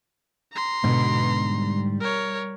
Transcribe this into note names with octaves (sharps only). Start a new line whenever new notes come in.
A#5 C6
G#2 B2 D3
G3
A#4 C#5